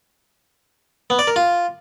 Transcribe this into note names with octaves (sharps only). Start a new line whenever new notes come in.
B3
D5
A#4
F4